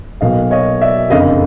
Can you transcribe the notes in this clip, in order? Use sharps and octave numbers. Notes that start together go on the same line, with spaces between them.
B1 B2 F#3 A#3 D#5 F5
C#5 D#5
D5 E5
F#1 F2 D3 D#5 F5